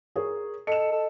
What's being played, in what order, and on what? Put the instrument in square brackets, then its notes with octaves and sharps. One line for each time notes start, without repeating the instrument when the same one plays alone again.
[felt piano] G#4 A#4 C#5
[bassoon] A4 [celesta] D#5 [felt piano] C#7 E7
[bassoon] A4